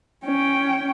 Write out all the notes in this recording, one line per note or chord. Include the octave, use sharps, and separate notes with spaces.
C#4 G5